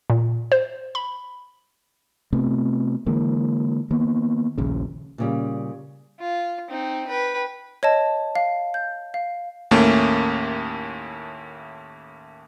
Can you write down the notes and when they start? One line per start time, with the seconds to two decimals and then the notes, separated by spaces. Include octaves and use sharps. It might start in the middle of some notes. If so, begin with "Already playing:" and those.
0.10 A#2
0.52 C5
0.95 B5
2.33 C3 A3 B3 C4
3.06 D3 E3 G#3 A#3
3.90 D#3 A#3 B3
4.58 A#1 D#2 C#3
5.18 A#2 C#3 G3
6.20 F4
6.69 C4 D#4
7.08 B4 G5
7.83 C#5 D#5 A5
8.36 F5
8.74 G6
9.14 F5
9.71 D#2 A2 A3 A#3 C#4